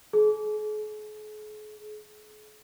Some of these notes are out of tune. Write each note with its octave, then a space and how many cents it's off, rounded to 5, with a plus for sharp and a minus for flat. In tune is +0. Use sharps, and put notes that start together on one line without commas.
G#4 +45